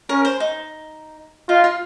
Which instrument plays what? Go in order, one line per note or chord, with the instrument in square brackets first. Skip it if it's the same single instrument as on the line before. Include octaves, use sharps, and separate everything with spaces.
[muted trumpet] C#4 [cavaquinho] A#4
[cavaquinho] C5
D#4
[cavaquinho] D#4 [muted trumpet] F4
[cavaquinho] F4